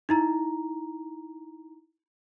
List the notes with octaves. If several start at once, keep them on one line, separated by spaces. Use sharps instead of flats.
D#4 E4 A#5